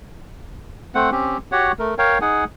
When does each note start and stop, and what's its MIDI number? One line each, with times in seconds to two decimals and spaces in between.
0.95 1.10 57
0.95 1.10 60
0.95 1.10 72
0.95 1.10 78
1.12 1.38 60
1.12 1.38 61
1.12 1.38 67
1.52 1.72 66
1.52 1.72 67
1.52 1.72 73
1.52 1.72 78
1.79 1.95 57
1.79 1.95 70
1.98 2.19 70
1.98 2.19 73
1.98 2.19 77
1.98 2.19 79
2.21 2.44 63
2.21 2.44 68
2.21 2.44 78
2.21 2.44 80